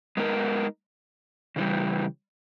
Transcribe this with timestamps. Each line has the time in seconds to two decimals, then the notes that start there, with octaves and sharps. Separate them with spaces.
0.17 G#3 B3 D#4 A#4
1.56 C#3 E3 G3